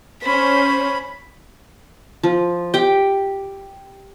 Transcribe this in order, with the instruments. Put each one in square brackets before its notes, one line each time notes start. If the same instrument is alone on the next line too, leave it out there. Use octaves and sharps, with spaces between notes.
[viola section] C#4 C5 [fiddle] B5
[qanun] F3
G4 G5